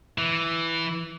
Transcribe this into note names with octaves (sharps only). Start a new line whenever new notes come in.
E3